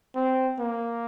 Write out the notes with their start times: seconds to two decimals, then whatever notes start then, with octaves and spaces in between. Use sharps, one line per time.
0.16 C4
0.60 A#3